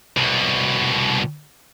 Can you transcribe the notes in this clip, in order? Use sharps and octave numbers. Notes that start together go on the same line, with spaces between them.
C2 B2